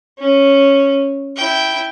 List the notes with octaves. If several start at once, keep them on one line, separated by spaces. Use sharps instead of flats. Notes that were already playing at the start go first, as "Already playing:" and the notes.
C#4
E4 G5